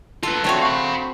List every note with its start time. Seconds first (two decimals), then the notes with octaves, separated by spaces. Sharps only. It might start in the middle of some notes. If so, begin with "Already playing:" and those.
0.23 F4 A4 B4
0.44 D3 A3 C4 F#4 C#5
0.62 F5 B5